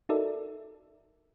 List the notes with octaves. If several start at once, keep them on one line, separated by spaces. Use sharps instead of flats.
D#4 F#4 A4 A#4 D5 E5